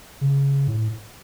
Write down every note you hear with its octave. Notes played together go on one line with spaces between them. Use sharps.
C#3
A2